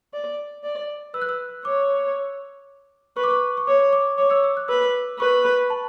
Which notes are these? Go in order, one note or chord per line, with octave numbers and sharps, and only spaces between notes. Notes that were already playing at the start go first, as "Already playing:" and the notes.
D5
D5
B4 E6
F#6
E6
C#5 D6
B4 C#6
D6
C#6
C#6
C#5 D6
D6
C#5 D6
E6
E6
F#6
B4 E6
B4 C#6
B5
A5